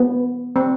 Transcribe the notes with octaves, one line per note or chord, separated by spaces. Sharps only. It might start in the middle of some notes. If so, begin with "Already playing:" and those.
Already playing: B3
C4